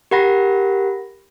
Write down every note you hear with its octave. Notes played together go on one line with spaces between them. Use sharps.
G4 A#4 F#5 B5 A#6